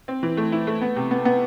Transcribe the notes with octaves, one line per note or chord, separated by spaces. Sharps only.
C4
E3
A3
E4
A3
B3
C3
B3
B3